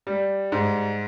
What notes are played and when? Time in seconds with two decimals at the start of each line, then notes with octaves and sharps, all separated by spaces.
0.07 G3
0.52 G#2